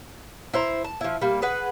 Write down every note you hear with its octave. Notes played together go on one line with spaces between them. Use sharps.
E4 C5 A#5
A5
F3 E4
G3 A#3
G#4 B4 F#5